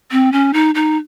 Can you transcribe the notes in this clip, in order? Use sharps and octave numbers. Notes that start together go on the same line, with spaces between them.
C4
C#4
D#4
D#4